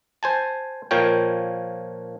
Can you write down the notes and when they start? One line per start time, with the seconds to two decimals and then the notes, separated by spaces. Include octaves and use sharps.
0.23 C5 G#5 A5
0.91 A#2 F3 A#4 C#5 G5